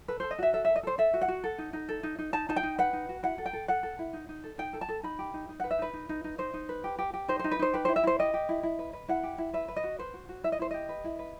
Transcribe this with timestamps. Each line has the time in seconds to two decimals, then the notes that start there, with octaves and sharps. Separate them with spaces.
0.08 A4 B4
0.20 A4 C5
0.31 D#5
0.39 F#4 E5
0.53 A4 E5
0.65 A4 E5
0.76 D#5
0.83 A4 C5
0.98 A4 E5
1.14 F#4
1.21 F#5
1.28 F#4
1.44 A4
1.58 D#4
1.73 D#4
1.89 A4
2.03 D#4
2.19 D#4
2.33 D#4 A5
2.49 D#4 A5
2.56 G5
2.63 D#4
2.78 B4 F#5
2.93 D#4
3.09 F#4
3.23 E4 F#5
3.38 A4
3.46 G5
3.53 A4
3.68 A4 F#5
3.83 A4
3.99 E4
4.13 D#4
4.29 D#4
4.44 A4
4.58 D#4 G5
4.73 A4
4.81 A5
4.89 A4
5.03 D#4 B5
5.19 G4
5.34 D#4
5.49 D#4
5.60 B4 F#5
5.71 E5
5.79 D#4 B4
5.93 D#4
6.09 D#4
6.24 D#4
6.38 D#4 C5
6.54 D#4
6.69 B4
6.84 G4
6.99 G4
7.13 G4
7.28 D#4 C5
7.39 D#4 C5
7.51 B4
7.59 D#4 C5
7.73 G4 B4
7.85 E4 C5
7.96 E5
8.04 E4 C5
8.19 G4 D#5
8.34 G4
8.49 E4
8.63 E4
8.79 B4
8.93 B4
9.08 E4 F#5
9.23 G4
9.38 E4
9.53 B4 E5
9.68 B4
9.76 D#5
9.84 F#4
9.99 B4 C5
10.14 F#4
10.29 F#4
10.44 E4 E5
10.52 D#5
10.59 E4 C5
10.71 G4 D#5
10.89 B4
11.04 E4
11.19 B4